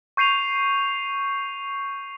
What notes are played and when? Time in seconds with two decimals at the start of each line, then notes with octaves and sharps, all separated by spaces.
0.17 C#6 G6 C7 D#7 F7